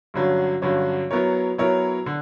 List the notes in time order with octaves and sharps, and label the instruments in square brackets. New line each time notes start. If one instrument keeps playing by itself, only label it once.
[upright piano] G2 D3 F#3 C#4
G2 D3 F#3 C#4
F#3 B3 E4 A#4 C#5
F#3 B3 E4 A#4 C#5
D3